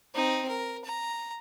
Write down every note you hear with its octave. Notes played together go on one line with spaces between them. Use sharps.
C4 D#4
A#4
A#5